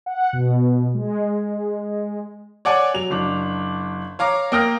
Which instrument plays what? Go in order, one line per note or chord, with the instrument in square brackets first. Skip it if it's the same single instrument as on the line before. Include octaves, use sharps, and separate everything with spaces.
[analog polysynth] F#5
B2
G#3
[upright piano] C#5 D5 F#5 G#5
F#3 F7
F#1 D4
C#5 F5 A#5 D6
A#3 G5 D#6 F6 A#6